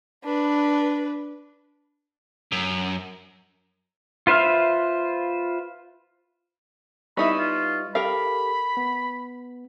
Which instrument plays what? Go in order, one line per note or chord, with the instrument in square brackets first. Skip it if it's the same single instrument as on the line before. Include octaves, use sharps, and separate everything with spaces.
[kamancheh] D4 B4
[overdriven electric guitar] F#2
[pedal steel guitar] F4 B4 C5 E5 F6
[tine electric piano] G3 D#5 C#6 [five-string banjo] B3 D#4 E4 [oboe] B5
[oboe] F4
[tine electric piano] G4 A4 [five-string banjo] A#4 F5 [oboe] B5
[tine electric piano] B3